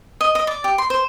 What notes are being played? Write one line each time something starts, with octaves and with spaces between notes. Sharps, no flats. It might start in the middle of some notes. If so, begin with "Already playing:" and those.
D#5
D#5
D5
G4
C6
C5